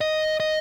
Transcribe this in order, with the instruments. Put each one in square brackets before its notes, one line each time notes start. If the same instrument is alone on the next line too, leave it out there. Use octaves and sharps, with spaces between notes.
[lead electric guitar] D#5
D#5